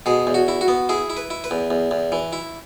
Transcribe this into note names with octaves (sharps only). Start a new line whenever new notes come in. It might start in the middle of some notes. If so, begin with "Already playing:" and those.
B2 G#4
E2
F#4
E4
F#4
B3
E4 G#4
E4
B4
E4
B4
E2
E2
E2
E3
E4